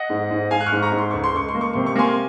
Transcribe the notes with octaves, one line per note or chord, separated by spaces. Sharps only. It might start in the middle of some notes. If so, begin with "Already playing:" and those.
Already playing: D#5 F#5
G#2
G#2
G#2 F5 G#5
F#6
C#6 F6
G#2
A#5 C#6
G#2
C6
C#2 C#6
C6
C#2 C#6
C6
A#3
C#6
C3 C6
C#6
A#3 G#5 C6